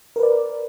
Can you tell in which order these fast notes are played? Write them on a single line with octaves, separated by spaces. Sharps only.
A#4 B4 D5